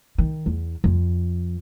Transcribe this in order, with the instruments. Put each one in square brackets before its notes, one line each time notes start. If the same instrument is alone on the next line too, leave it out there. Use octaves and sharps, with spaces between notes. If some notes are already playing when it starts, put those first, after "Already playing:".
[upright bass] D#3
E2
F2